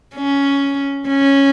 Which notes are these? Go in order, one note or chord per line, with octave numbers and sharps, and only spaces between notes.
C#4
C#4